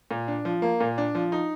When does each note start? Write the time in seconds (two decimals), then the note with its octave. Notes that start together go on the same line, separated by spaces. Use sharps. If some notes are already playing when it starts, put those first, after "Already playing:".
0.11 A#2
0.28 D4
0.45 F3
0.62 A#3
0.80 A#2
0.98 D4
1.15 F3
1.32 D#4